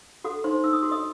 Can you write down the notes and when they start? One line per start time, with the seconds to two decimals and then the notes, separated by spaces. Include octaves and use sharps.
0.24 F#4 A4 F#5
0.44 D#4 C5 C6
0.64 D#4 E6
0.73 D#6
0.83 F#4 C6
0.92 D#5 D#6